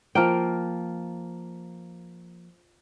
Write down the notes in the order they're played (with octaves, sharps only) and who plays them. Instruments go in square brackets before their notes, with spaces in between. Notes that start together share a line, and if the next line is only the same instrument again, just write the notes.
[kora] F3 A#3 G5